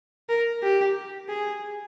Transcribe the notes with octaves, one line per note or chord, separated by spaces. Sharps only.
A#4
G4
G#4